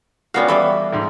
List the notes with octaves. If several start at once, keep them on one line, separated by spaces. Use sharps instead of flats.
G3 B3 C#4 F4 F#4 F5
E3 G3 A4 B5 D6
C#2 G#2